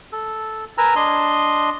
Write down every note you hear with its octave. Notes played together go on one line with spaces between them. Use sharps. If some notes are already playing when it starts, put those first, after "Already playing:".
A4
A#4 B4 G#5 A#5 E6
D4 D#5 C6